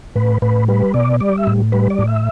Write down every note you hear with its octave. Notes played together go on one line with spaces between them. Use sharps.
A2 B4
A2 B4
G3 B4
B2 D5
G3 D5
E5
A2
G3 B4
D5
A2
E5